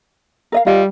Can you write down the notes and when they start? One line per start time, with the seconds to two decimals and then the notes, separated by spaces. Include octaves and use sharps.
0.52 A#4 D#5 F5
0.66 G3 F4 D#5 F5